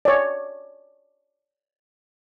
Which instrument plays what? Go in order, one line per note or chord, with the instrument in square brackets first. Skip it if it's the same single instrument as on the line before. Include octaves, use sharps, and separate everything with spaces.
[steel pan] C#5 D5